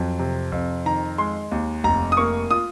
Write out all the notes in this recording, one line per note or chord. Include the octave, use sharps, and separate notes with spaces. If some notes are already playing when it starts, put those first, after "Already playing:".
Already playing: F2 F#3
C3
F2
D#3 A#5
G#3 C6
D#2
F1 A#5
D#6
A#3 C#6
F4 D#6